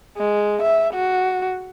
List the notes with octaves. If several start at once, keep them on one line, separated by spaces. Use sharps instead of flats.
G#3
E5
F#4